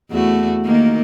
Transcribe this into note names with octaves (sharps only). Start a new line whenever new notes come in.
E2 A3 F#4
D#3 A#3